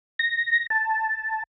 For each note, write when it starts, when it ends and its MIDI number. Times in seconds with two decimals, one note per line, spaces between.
0.19 0.67 94
0.70 1.43 81